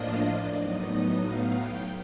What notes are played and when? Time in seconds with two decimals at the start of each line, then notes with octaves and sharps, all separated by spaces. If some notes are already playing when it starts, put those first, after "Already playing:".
Already playing: A2 F3 A#3 D4 F4 D#5
0.28 D5
0.58 A2 F#3 B3 D#4 D#5
1.20 F5
1.50 G5